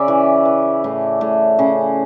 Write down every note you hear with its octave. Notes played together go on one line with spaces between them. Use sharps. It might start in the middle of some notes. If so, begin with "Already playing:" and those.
Already playing: C#3 D5 E5
E3
E3
A2
A2
C#3